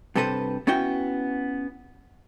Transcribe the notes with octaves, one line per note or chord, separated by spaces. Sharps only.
G2 C3 A4 B4 C5
B3 C#4 E4 F#4 G5